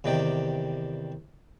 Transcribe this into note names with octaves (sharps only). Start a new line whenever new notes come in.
E2 C3 D#3 G4 D5